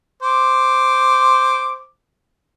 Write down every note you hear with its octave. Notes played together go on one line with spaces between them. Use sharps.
C5 D6